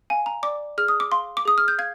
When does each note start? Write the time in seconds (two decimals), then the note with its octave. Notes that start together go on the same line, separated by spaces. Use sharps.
0.10 F5 G#5
0.26 A#5
0.43 D5 D6
0.78 G#4 F6
0.88 D#6
1.00 D6
1.11 F5 C6
1.37 D6
1.45 G#4 D#6
1.58 F6
1.68 G6
1.79 F5 G#6